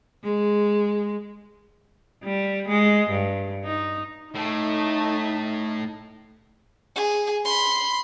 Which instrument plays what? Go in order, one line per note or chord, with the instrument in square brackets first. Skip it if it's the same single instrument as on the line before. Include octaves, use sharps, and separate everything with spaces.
[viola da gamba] G#3
G3
G#3
G2
D#4
[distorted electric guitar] A2 [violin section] A3 [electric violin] D#4
[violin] G#4
B5 C6